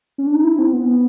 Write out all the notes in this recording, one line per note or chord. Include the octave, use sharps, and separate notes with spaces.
C#4
D4
D#4
E4
C4
B3